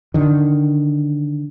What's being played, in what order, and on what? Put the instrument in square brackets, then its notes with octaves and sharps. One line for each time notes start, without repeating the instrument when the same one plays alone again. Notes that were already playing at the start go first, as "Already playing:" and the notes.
[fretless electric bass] D3 D#3